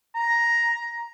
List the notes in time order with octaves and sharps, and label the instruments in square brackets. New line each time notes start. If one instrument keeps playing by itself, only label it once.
[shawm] A#5